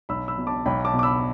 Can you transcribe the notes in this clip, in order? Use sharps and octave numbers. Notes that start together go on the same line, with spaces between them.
B1 B5 E6
B5 E6
B2
A5 D6
B1 G5 B5
A5 D6
B2
D6
B5 E6